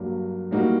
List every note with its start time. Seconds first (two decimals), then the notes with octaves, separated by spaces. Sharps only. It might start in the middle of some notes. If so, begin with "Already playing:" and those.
Already playing: G2 F#3 A#3
0.51 A2 G3 A#3 D#4 F#4